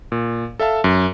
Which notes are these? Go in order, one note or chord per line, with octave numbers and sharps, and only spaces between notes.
A#2
A4 E5 F5 A5
F#2